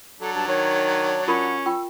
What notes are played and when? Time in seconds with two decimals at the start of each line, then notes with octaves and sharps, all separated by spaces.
0.20 F#3 D4 A4
0.35 G2 A5
0.47 D#3 C#5
1.28 C#4 F4 A#4 F#5 B5
1.66 F4 G5 C#6 E6